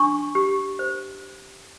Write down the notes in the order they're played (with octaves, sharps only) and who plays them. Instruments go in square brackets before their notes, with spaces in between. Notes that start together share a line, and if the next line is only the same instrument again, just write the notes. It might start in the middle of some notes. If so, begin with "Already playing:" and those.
Already playing: [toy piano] D4 C#6
G4
C5